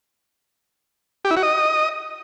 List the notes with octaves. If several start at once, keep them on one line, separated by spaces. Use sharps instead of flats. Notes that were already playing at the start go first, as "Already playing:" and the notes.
G4
E4
F#4
D#5